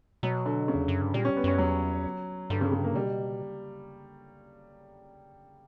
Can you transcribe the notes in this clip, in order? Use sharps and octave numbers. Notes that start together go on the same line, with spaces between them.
B2 F#3
D3
C#3
E2
F#2
G2
A#2 G3
C#4
B3
F#2 C#4
E2 F#3
G2 D3
C#3
C#3
A#3
B2 G3